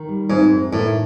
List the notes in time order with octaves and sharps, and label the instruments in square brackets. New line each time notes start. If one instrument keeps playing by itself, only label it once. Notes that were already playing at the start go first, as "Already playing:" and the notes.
Already playing: [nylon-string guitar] D#3
G3
[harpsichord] G#2 [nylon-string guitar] C4
[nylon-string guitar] F#2
[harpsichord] A2 [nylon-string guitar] D#3